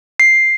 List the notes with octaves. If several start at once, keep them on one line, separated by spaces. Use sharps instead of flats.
C7